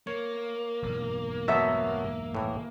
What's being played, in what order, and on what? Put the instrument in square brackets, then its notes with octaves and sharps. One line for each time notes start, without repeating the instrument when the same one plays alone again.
[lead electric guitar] A#3 [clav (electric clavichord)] C#5
[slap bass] E1 B1 G2
[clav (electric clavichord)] F#3 A3 B3 [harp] E5
[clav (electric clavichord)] A2 E3